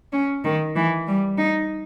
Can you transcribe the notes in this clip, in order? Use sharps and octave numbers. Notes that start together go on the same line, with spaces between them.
C#4
D#3
E3
G3
D#4